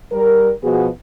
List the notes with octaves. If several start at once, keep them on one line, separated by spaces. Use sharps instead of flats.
G3 A#4
B2 F3 B3 F#4 G#4